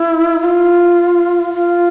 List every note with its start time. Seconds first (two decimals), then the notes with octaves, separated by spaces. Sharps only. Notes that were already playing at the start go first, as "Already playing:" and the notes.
Already playing: E4
0.40 F4
1.54 F4